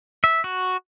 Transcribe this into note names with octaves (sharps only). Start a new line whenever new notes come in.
E5
F#4